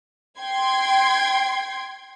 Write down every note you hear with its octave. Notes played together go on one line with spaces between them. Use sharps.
G5 C6 G#6